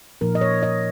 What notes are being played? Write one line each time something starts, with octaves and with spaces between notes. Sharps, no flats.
A#2 F3 A#3 D#4 A#4
D#5
C#5
D#5